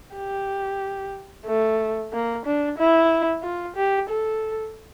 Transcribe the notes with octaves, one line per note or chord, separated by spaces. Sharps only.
G4
A3
A#3
D4
E4
F4
G4
A4